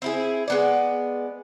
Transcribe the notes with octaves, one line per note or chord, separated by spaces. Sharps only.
C4 E4 G#4
G#3 B3 D5